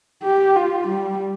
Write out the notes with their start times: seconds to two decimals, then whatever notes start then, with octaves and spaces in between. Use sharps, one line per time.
0.23 G4
0.56 F4
0.88 G3